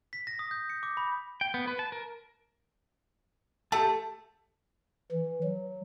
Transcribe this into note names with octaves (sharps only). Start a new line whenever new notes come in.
B6
A#6
D#6
G6
C#7
D6
B5
G5
B3
B4
A5
A#4
A3 G4 E5 A5
E3
F#3